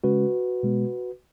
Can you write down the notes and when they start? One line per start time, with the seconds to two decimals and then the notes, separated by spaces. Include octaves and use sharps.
0.04 C#3 G#3 C#4 F#4 B4
0.63 B2 G#3 B3